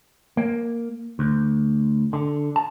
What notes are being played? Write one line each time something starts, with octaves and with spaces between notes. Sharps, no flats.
A#3
D2
D3
A5